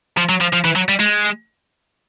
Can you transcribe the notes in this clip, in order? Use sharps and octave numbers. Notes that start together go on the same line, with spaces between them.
F3
F#3
F3
F3
E3
F#3
G3
G#3